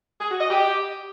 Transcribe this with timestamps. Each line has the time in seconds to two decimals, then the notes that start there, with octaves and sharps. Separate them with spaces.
0.21 G#4
0.31 F#4
0.41 D#5
0.50 G4